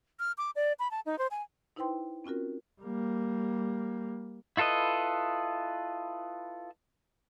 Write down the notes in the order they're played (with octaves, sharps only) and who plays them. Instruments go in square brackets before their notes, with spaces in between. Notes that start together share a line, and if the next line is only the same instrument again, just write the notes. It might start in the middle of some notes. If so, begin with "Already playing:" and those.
[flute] F6
D6
D5
B5
A5
D#4
C5
G#5
[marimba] D#4 E4 B4 C5 G5 C6
C4 C#4 F4 F#4 A#4
[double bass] G3 A#3
[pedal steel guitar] E4 F4 A4 B4 D#5